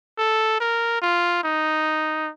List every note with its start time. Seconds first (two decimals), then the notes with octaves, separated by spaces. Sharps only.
0.18 A4
0.61 A#4
1.02 F4
1.44 D#4